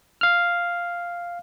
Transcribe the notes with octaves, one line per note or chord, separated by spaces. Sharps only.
F5 F6